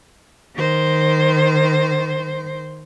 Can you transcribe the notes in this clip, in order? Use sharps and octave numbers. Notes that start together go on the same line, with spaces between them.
D#3 C5